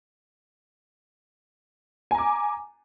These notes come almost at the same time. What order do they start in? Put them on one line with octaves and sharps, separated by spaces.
G#5 A#5 D6